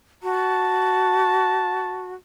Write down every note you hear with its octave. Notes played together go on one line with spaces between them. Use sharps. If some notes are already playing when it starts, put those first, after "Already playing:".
F#4 A5